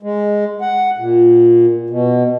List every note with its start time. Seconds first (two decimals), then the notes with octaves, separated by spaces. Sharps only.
0.03 G#3
0.61 F#5
0.98 A#2
1.90 B2